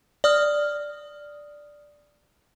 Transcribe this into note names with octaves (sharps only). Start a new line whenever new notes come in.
D5 D#6 F6